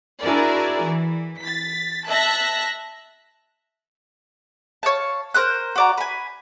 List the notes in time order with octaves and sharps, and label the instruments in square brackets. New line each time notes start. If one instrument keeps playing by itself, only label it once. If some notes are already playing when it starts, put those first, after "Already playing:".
[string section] D4 E4 F#4 G#4 A#4 D5
E3
A6 B6
E5 A5 F#6 A#6
[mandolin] C#5 F5 A5
A#4 C5 F6 F#6
F#4 D5 A#5
B4 G#5